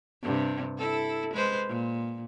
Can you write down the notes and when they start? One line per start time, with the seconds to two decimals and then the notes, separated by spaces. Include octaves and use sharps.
0.22 G2 C3
0.78 E4 A4
1.34 G#3 B4 C5
1.68 A#2